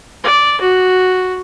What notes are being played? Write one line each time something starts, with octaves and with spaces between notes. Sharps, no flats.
D5
F#4